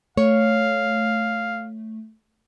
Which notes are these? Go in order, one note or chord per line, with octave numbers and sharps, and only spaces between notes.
A3 C#5 F5